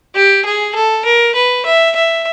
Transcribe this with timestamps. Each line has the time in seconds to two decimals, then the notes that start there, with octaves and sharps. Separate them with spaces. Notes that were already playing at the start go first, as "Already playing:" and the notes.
0.15 G4
0.45 G#4
0.75 A4
1.05 A#4
1.35 B4
1.65 E5
1.96 E5